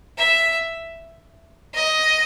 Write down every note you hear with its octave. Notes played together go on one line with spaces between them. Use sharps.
E5
D#5